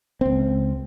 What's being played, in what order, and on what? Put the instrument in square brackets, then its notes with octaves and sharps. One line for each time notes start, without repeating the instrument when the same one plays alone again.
[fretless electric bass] C#2 C4